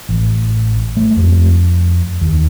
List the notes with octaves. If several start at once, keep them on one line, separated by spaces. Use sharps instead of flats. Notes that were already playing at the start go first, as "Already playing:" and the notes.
A1
A3
F2
D#2